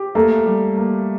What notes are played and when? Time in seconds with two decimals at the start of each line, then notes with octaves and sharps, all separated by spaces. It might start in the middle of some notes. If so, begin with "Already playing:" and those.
Already playing: G4
0.15 A3 A#3
0.46 G3
0.77 A#3